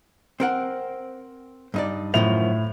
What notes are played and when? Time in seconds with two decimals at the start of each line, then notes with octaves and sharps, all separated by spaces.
0.40 C4 A#4 F#5
1.74 G2 D#4 D5
2.14 F#2 A2 D#3 F3 F7